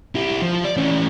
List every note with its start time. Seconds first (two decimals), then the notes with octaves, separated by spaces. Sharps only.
0.15 E4 G4
0.42 F3
0.64 D5
0.77 E3 C#4